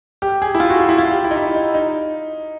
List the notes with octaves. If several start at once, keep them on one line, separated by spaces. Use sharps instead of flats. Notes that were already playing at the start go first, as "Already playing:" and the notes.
G4
G#4
E4
F4
F#4
F4
E4
F4
G4
E4
D#4
E4
D#4
D#4